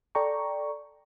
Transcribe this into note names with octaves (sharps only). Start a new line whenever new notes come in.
A4 D5 G5 A#5 C#6